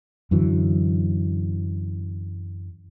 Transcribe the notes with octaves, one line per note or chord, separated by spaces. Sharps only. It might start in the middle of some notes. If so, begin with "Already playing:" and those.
F#2 D3 E3 F#3